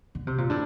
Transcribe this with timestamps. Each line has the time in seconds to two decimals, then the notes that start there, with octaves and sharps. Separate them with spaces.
0.15 D3
0.27 C3
0.38 A#2
0.50 A2 D4